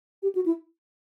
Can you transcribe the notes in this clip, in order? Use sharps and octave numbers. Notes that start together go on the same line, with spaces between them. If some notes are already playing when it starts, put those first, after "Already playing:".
G4
F#4
E4